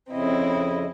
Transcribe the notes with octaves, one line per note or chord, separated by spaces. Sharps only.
F2 C#3 C4 E4 D#5